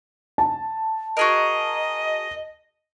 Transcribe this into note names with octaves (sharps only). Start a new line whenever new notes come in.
A5
F#4 G#4 A#4 D#5